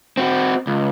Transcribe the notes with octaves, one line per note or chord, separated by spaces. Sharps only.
C4 F#4
C#2